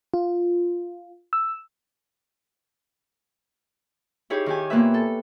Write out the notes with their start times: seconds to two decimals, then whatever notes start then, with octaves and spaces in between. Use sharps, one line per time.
0.14 F4
1.33 E6
4.30 D#4 E4 G4 G#4 C#5
4.46 D#3 G4 G#5
4.70 A#2 A#3 B3 B4 E5
4.94 A4